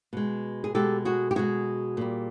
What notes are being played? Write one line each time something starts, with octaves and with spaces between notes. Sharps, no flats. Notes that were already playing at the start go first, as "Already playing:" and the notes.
B2 G#3
G#4
B2 G#3 G4 A4
F#4 G#4
G4
B2 G#3 F#4 G#4
A#2 G3